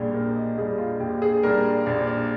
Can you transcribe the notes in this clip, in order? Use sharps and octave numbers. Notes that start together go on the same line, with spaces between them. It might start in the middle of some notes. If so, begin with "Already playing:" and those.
Already playing: A#1 A#2 G3 D4 G4 G#4
A#1 A#4
D#5
A#2 G3 D4 G#4
F4
A#1 G4
G#4
A#2 G3 D4 A#4
A#1 D5
D5